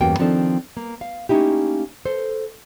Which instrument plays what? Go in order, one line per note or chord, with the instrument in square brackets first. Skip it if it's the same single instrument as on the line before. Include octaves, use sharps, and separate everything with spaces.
[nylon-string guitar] E2 G2 A#3 C#4 F#4 G5
D#3 F3 C4 D4 D#4 A4
A#3
F5
A3 A#3 C#4 D#4 E4 G4
A4 C5